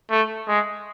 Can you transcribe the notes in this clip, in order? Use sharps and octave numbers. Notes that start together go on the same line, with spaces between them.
A3
G#3